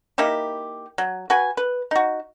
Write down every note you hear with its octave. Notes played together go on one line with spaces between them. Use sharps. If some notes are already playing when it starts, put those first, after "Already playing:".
A#3 D#4 E4 G4
F#3
F#4 B4 G#5
B4
D#4 F#4